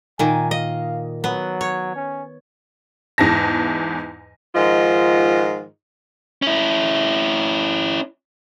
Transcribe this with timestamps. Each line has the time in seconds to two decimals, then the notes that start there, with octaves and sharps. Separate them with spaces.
0.19 A#2 D#3 G#5
0.51 D#5 F5
1.24 F#3 B3
1.61 C#5
1.96 C#4
3.18 E2 G#2 E3 A5 A#6
4.56 G#2 D#3 F3 F4 D#5
6.42 C#4 E4